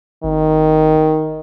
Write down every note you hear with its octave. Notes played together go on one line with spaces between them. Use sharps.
G#1 D#3